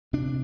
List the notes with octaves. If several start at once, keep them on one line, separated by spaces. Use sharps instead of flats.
C3 D4